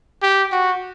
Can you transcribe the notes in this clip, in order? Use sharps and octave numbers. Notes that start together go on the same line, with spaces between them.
G4
F#4